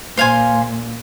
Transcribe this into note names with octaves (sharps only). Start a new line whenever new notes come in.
A#2 C5 F5 G#5 C6